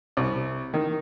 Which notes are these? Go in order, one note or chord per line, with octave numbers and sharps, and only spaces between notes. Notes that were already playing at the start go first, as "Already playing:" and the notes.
C2
D#3